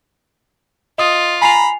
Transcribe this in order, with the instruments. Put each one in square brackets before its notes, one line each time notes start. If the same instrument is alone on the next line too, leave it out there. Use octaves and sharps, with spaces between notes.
[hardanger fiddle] F4 [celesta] D#5 D#6
[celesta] G#5 C7 F7 [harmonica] A#5 B5